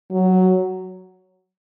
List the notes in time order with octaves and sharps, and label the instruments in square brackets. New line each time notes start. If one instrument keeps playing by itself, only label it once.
[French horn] F#3